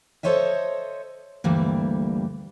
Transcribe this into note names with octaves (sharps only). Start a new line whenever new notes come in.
A4 C5 C#5 D#5 E5
D2 G2 E3 G3 A#3